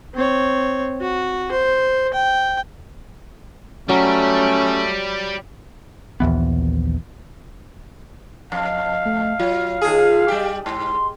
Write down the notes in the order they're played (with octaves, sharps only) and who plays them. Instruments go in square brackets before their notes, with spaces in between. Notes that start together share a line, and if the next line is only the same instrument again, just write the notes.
[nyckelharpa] C4 C#5
F#4
C5
G5
[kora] F#3 [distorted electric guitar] G3 [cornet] A3 [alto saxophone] C#4
[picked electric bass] A#1 D#2 E3 B3
[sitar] F2 [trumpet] F5
[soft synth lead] A3
[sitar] F#3 [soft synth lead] F4
[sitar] D#2 G#4
G3 G4
[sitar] G#2 [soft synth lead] C6